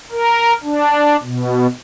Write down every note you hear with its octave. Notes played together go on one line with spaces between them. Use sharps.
A#4
D4
B2